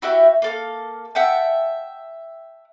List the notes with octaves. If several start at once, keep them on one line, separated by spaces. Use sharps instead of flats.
E4 F#4 G4 E5
A#3 A4 F5
E5 F#5 G5 A5